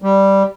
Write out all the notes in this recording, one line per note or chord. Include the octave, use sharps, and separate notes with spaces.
G3